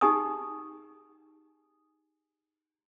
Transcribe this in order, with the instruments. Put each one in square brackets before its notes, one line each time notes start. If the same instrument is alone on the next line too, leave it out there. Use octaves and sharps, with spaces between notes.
[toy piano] D#4 G4 G#4 G#5 C#6 D#6